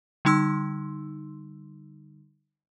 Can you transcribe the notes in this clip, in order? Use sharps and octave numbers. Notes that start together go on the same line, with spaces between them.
D3 G3 D#4 C6 E6